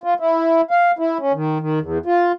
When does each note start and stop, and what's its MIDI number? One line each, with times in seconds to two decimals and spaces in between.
0.04 0.14 65
0.20 0.61 64
0.71 0.91 77
0.99 1.18 64
1.19 1.32 61
1.33 1.59 51
1.60 1.79 51
1.80 1.98 40
2.06 2.32 65